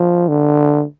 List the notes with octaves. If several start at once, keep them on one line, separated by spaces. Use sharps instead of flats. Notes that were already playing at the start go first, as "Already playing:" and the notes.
Already playing: F3
D3